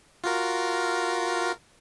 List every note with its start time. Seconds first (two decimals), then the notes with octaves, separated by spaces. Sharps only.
0.24 F4 F#4 A#4